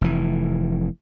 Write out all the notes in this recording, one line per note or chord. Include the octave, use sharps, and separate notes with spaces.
F1 E3